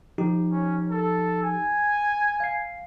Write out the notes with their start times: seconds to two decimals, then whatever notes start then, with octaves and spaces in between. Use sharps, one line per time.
0.18 F3 D#4 G4
0.52 C#4
0.91 A4
1.43 G#5
2.40 F5 C7